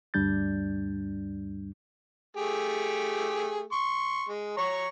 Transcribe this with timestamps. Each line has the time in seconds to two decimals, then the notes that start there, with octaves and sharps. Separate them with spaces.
0.14 D2 G2 G3 D4 G6 A6
2.37 A3 G4 G#4
3.72 C6 C#6
4.28 G#3
4.57 C#5 A#5 C#6